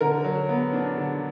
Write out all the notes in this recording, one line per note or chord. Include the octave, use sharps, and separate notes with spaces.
D3 A#4
F#3
B3
D4
D3